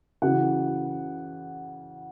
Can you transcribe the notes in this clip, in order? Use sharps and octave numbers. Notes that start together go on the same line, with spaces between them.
C#3 E3 F#4 F#5